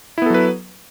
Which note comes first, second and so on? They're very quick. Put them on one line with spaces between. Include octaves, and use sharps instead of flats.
E4 B3 A4 F#3 B4